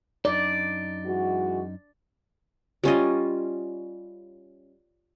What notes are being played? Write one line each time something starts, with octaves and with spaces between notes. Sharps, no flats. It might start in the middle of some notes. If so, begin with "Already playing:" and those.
F#2 D#4 D5
E3 G#3 F#4
G3 C#4 F4 D#5